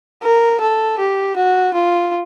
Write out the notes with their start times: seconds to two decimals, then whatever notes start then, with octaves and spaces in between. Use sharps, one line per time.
0.23 A#4
0.61 A4
0.99 G4
1.36 F#4
1.74 F4